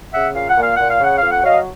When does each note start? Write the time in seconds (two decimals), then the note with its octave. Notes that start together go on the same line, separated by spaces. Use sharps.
0.13 C#3 E5 F#5
0.35 A#2 F5
0.49 F#5
0.57 A#2
0.63 F5
0.77 A#2 F#5
0.90 F5
1.00 C#3 F#5
1.18 F2 F5
1.31 F#5
1.43 F#3 D#5 F5